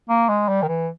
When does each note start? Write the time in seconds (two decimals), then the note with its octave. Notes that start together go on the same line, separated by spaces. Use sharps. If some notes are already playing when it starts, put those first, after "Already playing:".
0.09 A#3
0.29 G#3
0.49 G3
0.63 D#3
0.68 E3